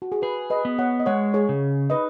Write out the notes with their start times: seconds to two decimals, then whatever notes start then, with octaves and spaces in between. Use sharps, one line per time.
0.02 F#4
0.12 G#4
0.22 G#4 B4
0.50 B4 D#5
0.65 B3
0.79 C#5 F#5
1.00 D#5
1.06 G#3 C#5 F#5
1.34 G#4 C#5
1.49 C#3
1.90 D#4 B4 D#5